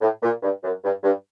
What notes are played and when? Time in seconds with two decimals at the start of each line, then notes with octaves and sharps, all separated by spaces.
0.01 A2
0.23 A#2
0.43 G2
0.64 F#2
0.84 G2
1.03 G2